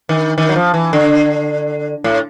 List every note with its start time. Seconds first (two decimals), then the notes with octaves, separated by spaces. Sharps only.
0.09 D#3
0.38 D#3
0.49 F#3
0.56 F3
0.74 E3
0.93 D3
2.04 A2